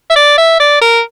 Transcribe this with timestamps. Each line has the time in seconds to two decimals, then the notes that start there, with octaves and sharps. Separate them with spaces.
0.10 E5
0.16 D5
0.38 E5
0.60 D5
0.81 A#4